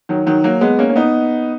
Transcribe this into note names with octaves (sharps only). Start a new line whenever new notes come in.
D#3 F#3
D#3 F#3
F#3 A#3
G#3 B3
A#3 C#4
C#4
B3 D#4